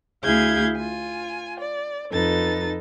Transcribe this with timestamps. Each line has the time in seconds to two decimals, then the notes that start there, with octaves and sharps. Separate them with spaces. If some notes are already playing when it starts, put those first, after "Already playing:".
0.23 D2 E4 G#4 F5 G6 G#6
0.76 F4 G#5
1.59 D5
2.12 F2 D#4 A4 B4 A6